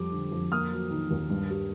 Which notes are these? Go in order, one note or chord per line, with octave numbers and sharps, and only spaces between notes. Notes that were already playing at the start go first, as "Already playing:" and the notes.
Already playing: F2 G3 D6
D3
F2
A#3 D#6 F6
F#3
D#3
D#2
G2
G3